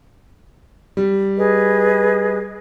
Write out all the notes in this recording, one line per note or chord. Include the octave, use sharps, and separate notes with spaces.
G3
G#4 B4 D#5